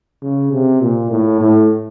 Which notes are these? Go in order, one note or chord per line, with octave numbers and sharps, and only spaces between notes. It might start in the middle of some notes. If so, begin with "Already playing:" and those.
C#3
C3
A#2
A2
A2